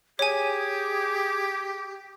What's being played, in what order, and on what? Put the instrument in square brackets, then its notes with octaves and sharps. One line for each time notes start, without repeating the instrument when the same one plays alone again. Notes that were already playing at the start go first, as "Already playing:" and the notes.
[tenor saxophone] G4 [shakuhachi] G#4 [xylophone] C#5 G#5